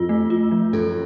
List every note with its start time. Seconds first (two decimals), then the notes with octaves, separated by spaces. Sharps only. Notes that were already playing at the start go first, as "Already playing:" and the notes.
Already playing: F2 F4
0.09 A3
0.30 F4
0.51 F3
0.73 F#2 A4